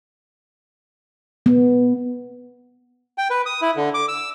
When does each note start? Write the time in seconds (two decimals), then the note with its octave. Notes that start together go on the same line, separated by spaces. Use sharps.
1.46 B3
3.18 G5
3.30 B4
3.46 D#6
3.62 E4
3.76 D3
3.94 D6
4.08 E6